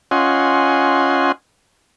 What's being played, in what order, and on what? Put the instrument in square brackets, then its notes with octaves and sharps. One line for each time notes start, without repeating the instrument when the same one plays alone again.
[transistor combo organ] C#4 F4 D#5 F#5 G#5 C6